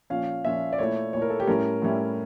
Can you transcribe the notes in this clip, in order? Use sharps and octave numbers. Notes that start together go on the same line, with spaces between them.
A#2 F3 C#4 F4 F5
A#2 F3 C#4 F4 E5
D5
A#2 A3 E4 C#5
A#2 A3 E4 C#5
A#4
A4
G4
A2 G3 C#4 E4 A#4
A2 G3 C#4 E4